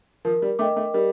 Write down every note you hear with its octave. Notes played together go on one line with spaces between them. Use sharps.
F3 A#4
G3
A3 D#5 G5 D6
A3
G3 A#4